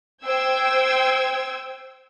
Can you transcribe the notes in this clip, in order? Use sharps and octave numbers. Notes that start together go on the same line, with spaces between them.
C5 G5 E6 G#6